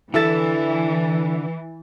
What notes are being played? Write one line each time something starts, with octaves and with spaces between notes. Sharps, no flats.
D3 E3 E4 A4 E5 A6